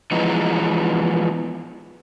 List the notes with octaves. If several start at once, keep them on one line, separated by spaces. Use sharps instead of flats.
E3 F3 G#3 B3 D#4